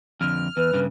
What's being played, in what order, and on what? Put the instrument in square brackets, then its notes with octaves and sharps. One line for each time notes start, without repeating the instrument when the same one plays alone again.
[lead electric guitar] F2 D3 [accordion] F6
[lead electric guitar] E2 [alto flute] B4
[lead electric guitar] G2 C#3